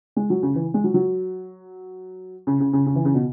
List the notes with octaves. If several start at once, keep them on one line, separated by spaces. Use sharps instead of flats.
G#3
F#3
C#3
E3
G#3
F#3
F#3
C#3
C#3
C#3
C#3
E3
C#3
B2